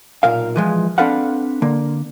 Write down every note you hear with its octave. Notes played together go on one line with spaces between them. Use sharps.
B1 A#2 A#4 F5
E3 F3 G#3
C4 D4 A4 B4 F5 F#5
D3 A#3